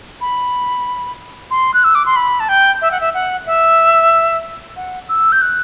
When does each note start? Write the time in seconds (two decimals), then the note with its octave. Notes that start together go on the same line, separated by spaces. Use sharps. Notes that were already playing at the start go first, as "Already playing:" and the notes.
0.21 B5
1.51 C6
1.74 F#6
1.84 E6
1.95 D6
2.06 C6
2.16 B5
2.40 A5
2.49 G5
2.81 E5
2.91 F#5
3.00 E5
3.14 F#5
3.46 E5
4.77 F#5
5.09 E6
5.32 G6
5.42 F#6